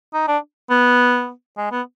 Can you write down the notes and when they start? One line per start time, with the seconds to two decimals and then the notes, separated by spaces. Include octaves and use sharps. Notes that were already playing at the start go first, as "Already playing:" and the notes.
0.14 D#4
0.28 D4
0.70 B3
1.57 G#3
1.71 B3